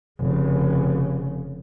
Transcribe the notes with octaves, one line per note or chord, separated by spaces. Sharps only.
F1 C#3